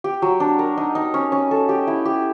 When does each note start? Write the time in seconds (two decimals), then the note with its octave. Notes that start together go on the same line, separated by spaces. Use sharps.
0.04 G4
0.22 F#3
0.40 D4
0.59 A#4
0.77 D#4
0.95 D#4
1.14 C#4
1.32 C#4
1.51 A4
1.69 G4
1.87 E4
2.05 G4